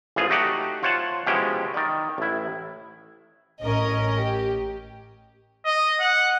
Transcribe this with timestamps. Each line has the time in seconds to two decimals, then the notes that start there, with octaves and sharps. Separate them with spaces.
0.16 A1 E3 F3 F4 G#4
0.30 A3 D#4 F#4 G4 D5 F#5
0.83 F4 C5 C#5 F#5 A5
1.27 B2 F3 G#3 C#4 E4 G4
1.74 D#3 D5
2.18 A1 E4
3.62 A1 C#4 A#4 D#5
4.17 G4
5.65 D#5
6.00 F#5